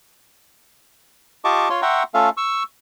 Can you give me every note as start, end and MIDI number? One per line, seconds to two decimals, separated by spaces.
1.44 1.69 65
1.44 1.69 67
1.44 1.69 75
1.44 1.69 81
1.44 1.69 85
1.44 1.69 86
1.70 1.82 65
1.70 1.82 73
1.70 1.82 84
1.82 2.03 76
1.82 2.03 78
1.82 2.03 79
1.82 2.03 82
1.82 2.03 84
1.82 2.03 85
2.14 2.29 57
2.14 2.29 61
2.14 2.29 65
2.14 2.29 69
2.14 2.29 76
2.14 2.29 77
2.37 2.63 85
2.37 2.63 88